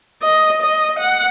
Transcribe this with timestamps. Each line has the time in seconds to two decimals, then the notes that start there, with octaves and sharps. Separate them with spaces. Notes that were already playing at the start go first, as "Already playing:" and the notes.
0.23 D#5
0.62 D#5
1.00 F#5